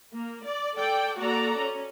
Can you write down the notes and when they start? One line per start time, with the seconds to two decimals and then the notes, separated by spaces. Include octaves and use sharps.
0.14 A#3
0.44 D5
0.75 A4 D5 G5
1.17 A#3 F#4 A4 D5 A#5
1.57 C#4